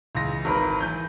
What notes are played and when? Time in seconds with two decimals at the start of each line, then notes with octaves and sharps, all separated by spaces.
0.15 C#2 E3 A#6
0.45 G#1 A#4 B4 B5
0.81 E3 G6